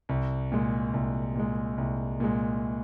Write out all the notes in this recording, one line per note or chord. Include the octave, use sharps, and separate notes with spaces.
C2
A#2 G#3
C2
A#2 G#3
C2
A#2 G#3